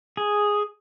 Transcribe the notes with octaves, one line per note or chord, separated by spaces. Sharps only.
G#4